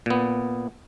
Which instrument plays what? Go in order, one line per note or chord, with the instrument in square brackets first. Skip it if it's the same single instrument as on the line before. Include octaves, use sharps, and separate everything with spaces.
[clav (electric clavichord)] A#2 B3